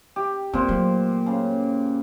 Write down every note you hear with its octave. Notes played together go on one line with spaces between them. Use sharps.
G4
A#2 C4 C5
F#3 A3
C#3